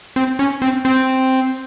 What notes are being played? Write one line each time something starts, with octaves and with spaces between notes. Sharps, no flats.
C4
C#4
C4
C4